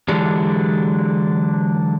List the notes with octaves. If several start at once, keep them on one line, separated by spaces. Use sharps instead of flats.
D3 E3 F#3 G#3 D4 G4